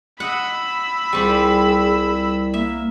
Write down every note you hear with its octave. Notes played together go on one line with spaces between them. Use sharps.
D#5 F#5 B5 E6
C2 G3 C4 F4 G#4
A#3 E5